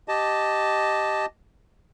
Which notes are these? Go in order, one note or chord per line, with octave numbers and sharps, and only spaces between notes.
G4 D#5 A5